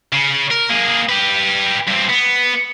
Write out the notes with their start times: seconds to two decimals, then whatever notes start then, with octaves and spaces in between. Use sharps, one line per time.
0.13 C#3
0.51 A#4
0.69 A#3 G#4
1.09 G4 B4
1.88 G2 C4
2.10 B3